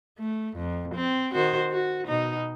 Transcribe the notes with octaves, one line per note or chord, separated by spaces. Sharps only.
A3
F2
C4
D#3 F#4 C5
F#4
B2 D#4